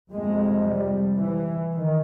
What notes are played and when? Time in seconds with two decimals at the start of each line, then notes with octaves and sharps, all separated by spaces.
0.11 F2 C3 G#3
0.65 G3
1.19 E3
1.73 D#3